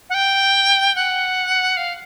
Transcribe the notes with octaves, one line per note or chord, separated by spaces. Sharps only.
F#5
G5
F#5
F5